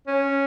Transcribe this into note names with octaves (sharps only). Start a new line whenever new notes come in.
C#4